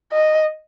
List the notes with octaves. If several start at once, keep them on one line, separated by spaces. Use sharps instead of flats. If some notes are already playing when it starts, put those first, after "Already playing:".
D#5